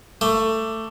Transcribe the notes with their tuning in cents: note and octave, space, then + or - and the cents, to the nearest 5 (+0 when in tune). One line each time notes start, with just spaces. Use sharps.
A3 +15 D6 +0